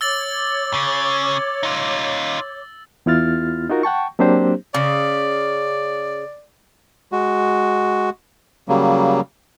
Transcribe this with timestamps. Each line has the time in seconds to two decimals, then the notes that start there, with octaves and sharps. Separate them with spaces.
0.01 C#5 D6 E6 A6 F#7
0.74 C#3 C#4
1.63 D#4 F4
3.06 E2 B3 E4 F4 F6 A6
3.69 D#4 F4 F#4 A#4
3.83 F#5 G5 A5 C#6
4.19 F#3 A#3 C4 D4 G4 C5
4.74 C#3 D5
7.12 G#3 F#4
8.69 C#3 F#3 G3 A#3